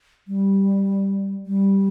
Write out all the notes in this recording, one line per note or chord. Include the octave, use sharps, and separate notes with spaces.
G3
G3